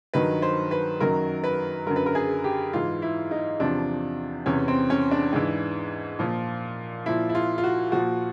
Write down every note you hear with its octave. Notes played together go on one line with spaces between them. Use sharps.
G2 D#3 F#3 B4
C5
B4
F#2 D#3 F#3 A#4
B4
F#2 D3 F#3 A#4
B4
A#4
G#4
G4
G#2 E3 F4
E4
D#4
E2 C3 F3 D4
E2 C3 E3 C#4
C4
C#4
D4
G#2 E3
A#2 F3
A#2 F3 E4
E4
F4
F4
F#4
A#2 F3 F#4